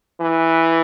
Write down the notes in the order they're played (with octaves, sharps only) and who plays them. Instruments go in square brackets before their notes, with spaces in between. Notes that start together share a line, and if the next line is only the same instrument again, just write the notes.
[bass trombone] E3